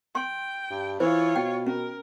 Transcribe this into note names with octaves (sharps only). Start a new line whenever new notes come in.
G5 C6
G2
E3 F4 C5 C#5
B2 G5
C#4 A#4